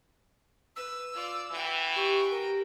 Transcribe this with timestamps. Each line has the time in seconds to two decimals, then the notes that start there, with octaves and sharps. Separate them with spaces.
0.76 B4 E6
1.14 F4 D5
1.51 E3 F#4 G5
1.96 G4 C#6
2.31 A#4